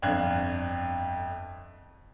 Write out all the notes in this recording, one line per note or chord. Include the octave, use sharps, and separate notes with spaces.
G1 F2 D4 F5 F#6 G#6